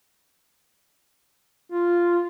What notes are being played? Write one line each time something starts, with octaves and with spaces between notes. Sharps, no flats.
F4